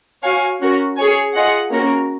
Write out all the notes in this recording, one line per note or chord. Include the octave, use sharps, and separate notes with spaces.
F#4 C#5 F5 G#5
C#4 F#4 A#4
G#4 C#5 G#5
F4 G#4 D#5 F#5
A#3 C#4 F#4 A#4